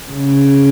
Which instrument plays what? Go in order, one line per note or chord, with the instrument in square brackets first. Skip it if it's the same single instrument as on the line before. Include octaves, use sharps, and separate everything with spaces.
[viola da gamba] C#3